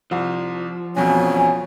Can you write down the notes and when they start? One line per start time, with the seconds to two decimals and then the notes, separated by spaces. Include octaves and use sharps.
0.11 C2 F3
0.96 E1 F2 B2 C#4 G#5